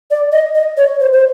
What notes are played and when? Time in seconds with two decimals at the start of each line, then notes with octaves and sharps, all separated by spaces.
0.11 D5
0.32 D#5
0.55 D#5
0.77 C#5
1.00 C5
1.13 C5